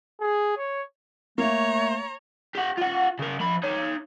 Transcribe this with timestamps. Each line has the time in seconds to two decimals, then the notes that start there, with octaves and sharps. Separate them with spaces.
0.21 G#4
0.58 C#5
1.38 A3 A#3 C#5 A#5
2.55 G4 F#5
2.77 F4 F#5
3.19 C#3 A#4
3.40 F3 B5
3.63 D#4 C#5